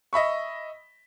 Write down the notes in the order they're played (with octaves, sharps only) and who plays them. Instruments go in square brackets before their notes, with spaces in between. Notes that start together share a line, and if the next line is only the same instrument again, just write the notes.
[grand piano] D#5 E5 B5 C#6